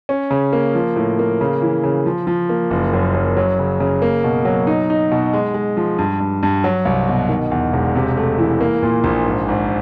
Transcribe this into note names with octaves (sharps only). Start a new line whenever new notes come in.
C#4
C#3
A#3
F3
A2
A#3
C#3
E3
C#3
F3
F3
A#3
F#1
F#2
F#2
F#3
C#3
C#3
A#3
B2
F#3
D#4
D#4
B2
G#3
G#3
F3
G2
G2
G2
F#3
C2
B2
D#3
E2
E1
C3
A3
E3
A#3
A#2
A#1
G#1
G#1